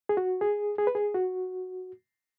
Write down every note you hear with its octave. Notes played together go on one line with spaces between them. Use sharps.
G#4
F#4
G#4
G#4
B4
G#4
F#4